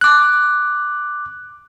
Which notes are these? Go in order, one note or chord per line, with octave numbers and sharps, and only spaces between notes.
D6 F#6